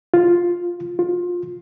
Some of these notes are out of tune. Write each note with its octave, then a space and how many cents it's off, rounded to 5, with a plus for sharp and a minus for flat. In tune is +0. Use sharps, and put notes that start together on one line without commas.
F4 +5
F4 +20